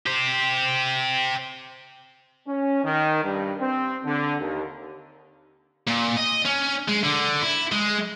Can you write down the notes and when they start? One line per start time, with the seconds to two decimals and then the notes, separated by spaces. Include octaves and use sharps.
0.06 G4 C5
2.47 C#4
2.84 D#3
3.23 G2
3.60 C4
4.04 D3
4.40 D#2
5.88 A#2
6.16 D#5
6.45 C#4
6.88 G#3
7.03 D3
7.42 E4
7.72 G#3